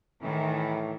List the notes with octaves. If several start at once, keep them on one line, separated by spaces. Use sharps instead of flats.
A2 D#3 E3